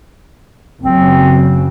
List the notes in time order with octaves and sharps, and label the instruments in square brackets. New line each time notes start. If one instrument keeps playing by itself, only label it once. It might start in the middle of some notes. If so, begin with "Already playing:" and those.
[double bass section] F#1 C#3 F#3 [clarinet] C4